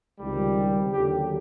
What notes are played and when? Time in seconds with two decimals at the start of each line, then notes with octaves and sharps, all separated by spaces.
0.20 C#2 C3 D#3 G3
0.92 D#2 D3 F#3 G4